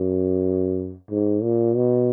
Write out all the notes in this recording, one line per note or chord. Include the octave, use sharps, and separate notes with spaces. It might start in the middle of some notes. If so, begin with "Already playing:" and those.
Already playing: F#2
G#2
A#2
B2